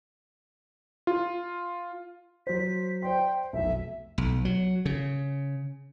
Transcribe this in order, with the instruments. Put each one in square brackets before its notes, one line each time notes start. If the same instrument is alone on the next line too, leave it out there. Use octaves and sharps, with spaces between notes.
[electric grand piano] F4
[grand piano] F#3 C5 [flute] B6
[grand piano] C5 D5 C6 [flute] G5
[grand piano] F1 B1 [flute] E5
[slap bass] B1
F#3
C#3